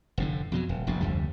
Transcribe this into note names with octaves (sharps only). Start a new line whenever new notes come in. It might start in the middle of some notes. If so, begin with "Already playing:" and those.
F1 A2 D3
F2 B2 F#3
D#1
F1 A#1 A2
F1 D2 D3 G3